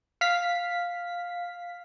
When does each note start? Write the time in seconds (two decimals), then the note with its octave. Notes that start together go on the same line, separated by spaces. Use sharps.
0.21 F5 B6